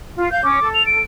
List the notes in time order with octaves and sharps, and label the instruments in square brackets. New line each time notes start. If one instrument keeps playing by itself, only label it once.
[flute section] F4
F5 G6
[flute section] C#4 [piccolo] D6
[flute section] A4
[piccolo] F7
D7